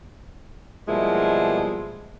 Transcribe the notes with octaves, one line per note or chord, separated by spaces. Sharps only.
B2 F3 G3 G#3 A#3 E4